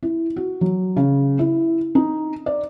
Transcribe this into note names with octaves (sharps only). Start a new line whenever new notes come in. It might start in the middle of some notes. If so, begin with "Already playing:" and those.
E4
F#4
F#3
C#3
E4
D#4
D5